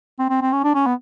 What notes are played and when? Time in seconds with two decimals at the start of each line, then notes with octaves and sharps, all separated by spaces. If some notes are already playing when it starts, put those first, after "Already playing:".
0.19 C4
0.29 C4
0.41 C4
0.52 C#4
0.64 D4
0.74 C#4
0.86 B3